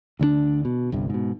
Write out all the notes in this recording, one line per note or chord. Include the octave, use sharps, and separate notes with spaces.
D2 D3 G3 D4
B2
G1 C2 G2
G#2 B2